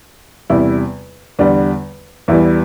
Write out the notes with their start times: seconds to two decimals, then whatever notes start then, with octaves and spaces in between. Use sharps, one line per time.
0.50 E2 C3 G3 E4
1.39 E2 D3 G3 D4
2.28 E2 E3 G3 E4